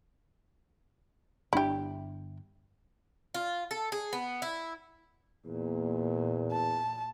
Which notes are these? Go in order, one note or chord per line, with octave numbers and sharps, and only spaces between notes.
G1 D4 E4 G4
F4
A4
G#4
B3
E4
E2 A#2
A5